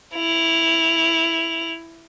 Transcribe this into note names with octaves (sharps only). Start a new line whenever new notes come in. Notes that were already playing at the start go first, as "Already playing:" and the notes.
E4 F7